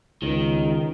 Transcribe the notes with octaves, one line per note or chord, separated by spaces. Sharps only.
C#2 D#3